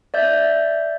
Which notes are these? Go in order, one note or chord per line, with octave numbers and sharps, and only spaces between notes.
D5 E5 G6